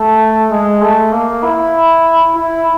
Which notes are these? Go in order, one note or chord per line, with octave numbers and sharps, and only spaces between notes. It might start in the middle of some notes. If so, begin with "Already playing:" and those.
Already playing: A3
G#3
A3
A#3
E4
E4